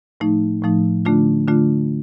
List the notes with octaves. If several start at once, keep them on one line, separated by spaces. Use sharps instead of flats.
A2 F3 A3 D#4
A2 F3 A3 D#4
D3 A3 D4 F4
D3 A3 D4 F4